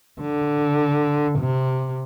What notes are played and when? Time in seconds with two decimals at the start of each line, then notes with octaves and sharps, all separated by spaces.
0.21 D3
1.39 C3